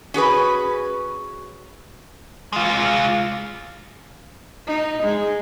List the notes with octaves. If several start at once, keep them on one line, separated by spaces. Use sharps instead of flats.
C#4 F#4 G#4 B4
G#3 F4
D#4
G#3